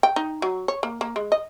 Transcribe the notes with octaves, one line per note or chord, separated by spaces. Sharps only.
G5
D#4
F#3
C#5
A#3
A#3
G#3
D#5